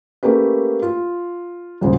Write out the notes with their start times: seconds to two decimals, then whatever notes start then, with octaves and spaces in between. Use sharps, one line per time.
0.23 A3 A#3 C#4 G4 B4
0.82 F4
1.81 D#1 G#1 C#3 C5